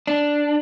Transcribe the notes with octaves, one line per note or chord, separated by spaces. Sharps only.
D4